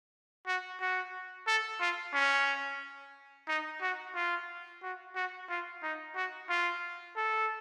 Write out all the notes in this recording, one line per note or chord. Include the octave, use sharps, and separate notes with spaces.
F#4
F#4
A4
F4
C#4
D#4
F#4
F4
F#4
F#4
F4
D#4
F#4
F4
A4